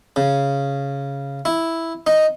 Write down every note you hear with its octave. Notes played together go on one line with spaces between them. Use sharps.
C#3
E4
D#4